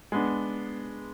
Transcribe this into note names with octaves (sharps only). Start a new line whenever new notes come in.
G#3 B3 D4